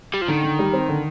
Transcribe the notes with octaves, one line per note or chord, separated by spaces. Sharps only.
G3
F3
D3 D#3
D3
G3
C4
D3